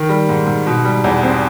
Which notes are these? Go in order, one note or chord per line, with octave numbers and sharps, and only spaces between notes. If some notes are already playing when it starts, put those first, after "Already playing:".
Already playing: D#3
G3
G#2
G#2
B2
G3
E2
C4